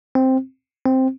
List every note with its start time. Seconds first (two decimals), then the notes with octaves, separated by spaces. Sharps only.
0.15 C4
0.85 C4